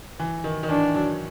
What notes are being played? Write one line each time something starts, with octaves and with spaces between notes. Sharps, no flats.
E3
D#3
D#3
E3 D4
F#3